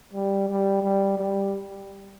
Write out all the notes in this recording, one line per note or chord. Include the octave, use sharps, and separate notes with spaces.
G3
G3
G3
G3